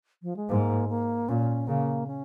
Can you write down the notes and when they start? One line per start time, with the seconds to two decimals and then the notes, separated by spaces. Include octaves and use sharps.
0.23 F3
0.37 G#3
0.49 G#2 A#3
0.89 A#3
1.29 A#2 C#4
1.67 C#3 A#3
2.07 C#4